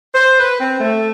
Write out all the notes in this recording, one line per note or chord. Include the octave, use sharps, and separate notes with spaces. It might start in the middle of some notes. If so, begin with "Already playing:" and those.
C5
B4
C4
A3